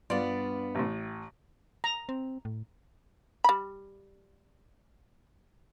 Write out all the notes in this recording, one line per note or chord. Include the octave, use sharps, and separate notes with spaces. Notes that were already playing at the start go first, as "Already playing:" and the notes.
G2 B3 F4 D5
A1 A2
A#5
C4
A2
G3 B5